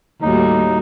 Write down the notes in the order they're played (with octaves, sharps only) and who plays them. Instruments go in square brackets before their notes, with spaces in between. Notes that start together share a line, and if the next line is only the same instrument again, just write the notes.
[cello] D#2 [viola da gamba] A2 G3 F#4 [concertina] D#4